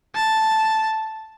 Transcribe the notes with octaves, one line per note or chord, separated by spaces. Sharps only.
A5